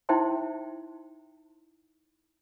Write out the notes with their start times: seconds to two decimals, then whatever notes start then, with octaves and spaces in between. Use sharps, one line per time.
0.09 D#4 E4 C5 E5 G5 C6